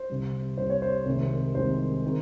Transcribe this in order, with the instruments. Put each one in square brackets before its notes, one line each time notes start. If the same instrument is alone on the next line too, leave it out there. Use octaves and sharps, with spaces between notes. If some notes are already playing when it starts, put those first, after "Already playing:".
Already playing: [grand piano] C5
C2 C3 G3
C2 C3 G3 C5
C#5
C5
C2 C3 D#3 G#3
C2 C3 D#3 G#3 C5
D#3